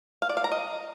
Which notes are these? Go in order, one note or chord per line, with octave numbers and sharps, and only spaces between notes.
F5
D5
F5
A#5
D#5